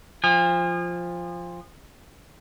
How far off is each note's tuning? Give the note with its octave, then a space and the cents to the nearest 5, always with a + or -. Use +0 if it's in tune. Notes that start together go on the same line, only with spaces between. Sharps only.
F3 +0 G#5 -40